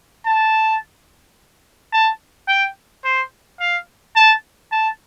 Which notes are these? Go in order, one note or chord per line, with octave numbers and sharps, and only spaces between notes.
A5
A5
G5
C5
F5
A5
A5